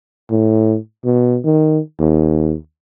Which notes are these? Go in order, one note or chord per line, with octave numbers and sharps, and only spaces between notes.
A2
B2
D#3
D#2